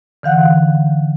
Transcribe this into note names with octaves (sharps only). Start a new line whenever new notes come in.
D3 E3 F5 F#5 F#6